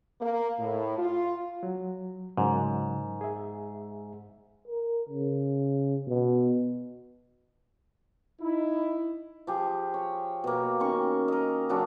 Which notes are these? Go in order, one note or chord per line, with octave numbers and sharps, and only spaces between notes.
A#3
A2
F4
F#3
G#2 C#3 F#3 A#4
G#4 E5
A#4
C#3
B2
D#4 E4
F3 G4 G#4
C#5
B2 A#3
D#3 C#4 C#6
A#4 D#5
C#3 F#3 D4 G#4